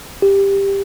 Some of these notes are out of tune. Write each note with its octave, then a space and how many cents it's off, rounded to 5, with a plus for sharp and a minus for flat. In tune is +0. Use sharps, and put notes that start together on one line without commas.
G4 +10